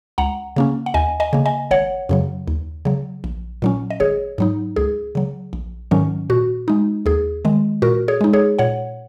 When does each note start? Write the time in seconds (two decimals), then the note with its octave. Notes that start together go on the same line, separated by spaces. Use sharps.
0.18 C#2 F#5 A#5
0.56 C#3 A#3 C#4
0.86 F#5
0.94 D#2 D#5 G#5
1.20 D#5 G#5
1.33 C#3 A#3
1.46 D#5 G#5
1.71 G#1 C#5 F#5
2.09 F#2 C#3 F#3
2.48 D#2
2.85 C#3 F#3
3.24 A#1
3.62 A#2 F#3 C#4
3.90 D#5
4.00 G#1 G#4 C#5
4.38 G#2 F#3 D#4
4.76 C#2 G#4
5.15 C#3 F#3
5.53 A#1
5.91 G#2 D#3 F#3 C#4
6.30 A#2 F#4
6.68 G#3 D#4
7.06 D#2 G#4
7.45 D#3 G#3
7.82 A#2 F#4 A#4
8.08 G#4 C#5
8.21 G#3 D#4
8.33 G#4 C#5
8.59 A#2 C#5 F#5